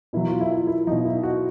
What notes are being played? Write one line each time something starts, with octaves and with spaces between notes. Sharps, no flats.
B2 F#3 E4
F4
E4
F4
E4
B2 F#3 D#4
E4
F#4